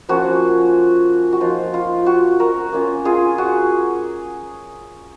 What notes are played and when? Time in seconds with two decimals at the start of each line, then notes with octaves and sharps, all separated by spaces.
0.09 F3 A#3 C#4 F4 F#4
1.33 F#4
1.40 F3 A#3 D#4 F4
1.74 F4
2.06 F#4
2.39 F#4 A#4
2.72 A#3 C#4 F4
3.05 F4 G#4
3.38 F#4